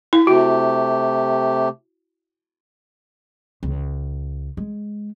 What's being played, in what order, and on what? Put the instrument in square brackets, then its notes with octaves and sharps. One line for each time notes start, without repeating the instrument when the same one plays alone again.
[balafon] E4
[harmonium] C3 A3 G4 [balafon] F#4
[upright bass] C#2
G#3